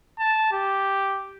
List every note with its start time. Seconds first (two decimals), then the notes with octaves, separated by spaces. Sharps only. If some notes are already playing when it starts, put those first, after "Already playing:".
0.19 A5
0.52 G4